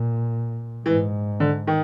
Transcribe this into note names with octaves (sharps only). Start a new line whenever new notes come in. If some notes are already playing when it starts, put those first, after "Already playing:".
Already playing: A#2
G#2 E3
D3
D#3